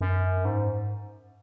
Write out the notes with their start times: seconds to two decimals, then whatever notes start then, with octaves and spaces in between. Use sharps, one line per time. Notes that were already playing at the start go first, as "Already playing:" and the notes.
0.01 F#2
0.45 G#2